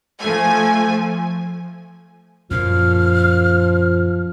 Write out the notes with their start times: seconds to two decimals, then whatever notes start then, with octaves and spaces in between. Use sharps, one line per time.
0.19 F3 A3 G#5
2.51 F#2 A#2 F3 F6